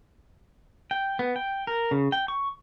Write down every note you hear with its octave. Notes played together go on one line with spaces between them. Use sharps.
G5
B3
G5
A#4
C#3
G5
C#6